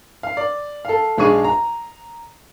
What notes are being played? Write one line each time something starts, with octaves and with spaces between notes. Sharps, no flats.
F5
D5
A4 F5
B1 G#3 D4 G#4 C#6 D#7
A#5